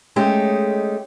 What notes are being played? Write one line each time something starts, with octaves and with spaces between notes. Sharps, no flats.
G#3 A3 C#4 D#4 G4